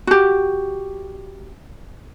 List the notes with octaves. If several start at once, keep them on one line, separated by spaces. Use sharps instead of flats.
F#4 G4